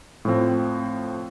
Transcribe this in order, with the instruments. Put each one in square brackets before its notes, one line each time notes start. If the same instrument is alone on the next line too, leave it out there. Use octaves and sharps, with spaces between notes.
[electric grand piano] A2 F3 C4